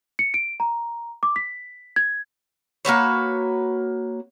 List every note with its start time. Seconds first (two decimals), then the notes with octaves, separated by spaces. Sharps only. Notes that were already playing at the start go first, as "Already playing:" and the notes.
0.19 C#7
0.34 D7
0.60 A#5
1.23 D6
1.36 B6
1.96 G#6
2.85 A#3 F#4 B4 C#5